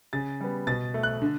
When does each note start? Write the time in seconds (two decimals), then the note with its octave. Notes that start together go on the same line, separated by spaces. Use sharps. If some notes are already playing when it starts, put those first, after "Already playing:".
0.13 C#3 A6
0.40 G3 B3
0.67 B2 A6
0.94 A3
1.03 F#6
1.22 D3